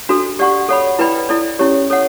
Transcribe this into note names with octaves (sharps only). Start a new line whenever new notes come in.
D4 F#4 A4
G4 D5 F#5 C#6
A4 C#5 F#5 B5
E4 B4 D5 G5 B5
E4 A4 D5
C#4 E4 G4 C#5
A4 C#5 F#5